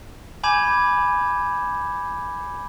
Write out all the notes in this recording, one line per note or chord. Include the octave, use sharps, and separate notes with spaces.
G#5 B5 D6 G6 G#6 E7